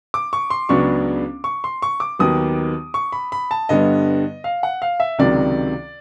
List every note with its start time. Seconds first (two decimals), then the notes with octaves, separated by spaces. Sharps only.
0.14 D6
0.33 C#6
0.50 C6
0.69 C#2 C#3 F#3 B3 D4 C#6
1.44 C#6
1.64 C6
1.82 C#6
2.00 D6
2.19 D#2 D#3 F#3 B3 D#6
2.94 C#6
3.12 B5
3.32 B5
3.51 A5
3.69 G2 D3 G3 B3 D#5
4.44 F5
4.63 F#5
4.82 F5
5.00 E5
5.19 C#2 C3 D#3 F#3 D5